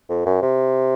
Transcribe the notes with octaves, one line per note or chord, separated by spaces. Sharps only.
F2
F#2
C3